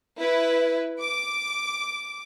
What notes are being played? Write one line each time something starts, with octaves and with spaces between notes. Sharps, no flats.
E4 B4
D6